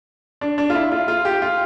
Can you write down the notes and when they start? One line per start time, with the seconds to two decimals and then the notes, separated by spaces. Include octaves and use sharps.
0.41 D4
0.58 D4
0.70 F4
0.75 E4
0.92 F4
1.08 F4
1.25 G4
1.42 F4